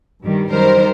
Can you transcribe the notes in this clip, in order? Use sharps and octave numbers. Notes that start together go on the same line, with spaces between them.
G2 D#3 G3
F#2 D#3 G3 A#4 C5